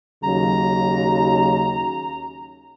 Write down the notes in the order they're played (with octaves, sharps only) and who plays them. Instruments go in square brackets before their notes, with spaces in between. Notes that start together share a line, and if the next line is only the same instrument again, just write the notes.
[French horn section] D#2 C#3 F#3 [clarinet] A#5